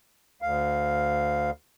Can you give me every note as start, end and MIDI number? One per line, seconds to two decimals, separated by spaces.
0.42 1.50 38
0.42 1.50 77